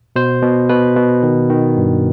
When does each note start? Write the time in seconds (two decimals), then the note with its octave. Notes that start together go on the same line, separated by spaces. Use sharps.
0.16 B2 C5
0.43 B2
0.69 B2 B4
0.96 B2
1.23 D#3
1.50 D#3
1.77 G2